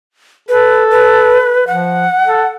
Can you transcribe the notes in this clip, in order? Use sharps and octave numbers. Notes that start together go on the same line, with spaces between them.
A4 B4
B4
F3 F#5
A4